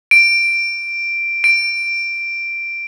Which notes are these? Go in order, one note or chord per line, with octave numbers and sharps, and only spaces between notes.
D7
D7